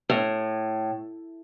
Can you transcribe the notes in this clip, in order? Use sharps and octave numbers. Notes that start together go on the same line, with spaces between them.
A2